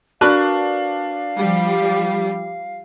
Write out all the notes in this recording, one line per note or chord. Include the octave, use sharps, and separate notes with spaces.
D4 F#4 A#4 B4 F5
F3 G3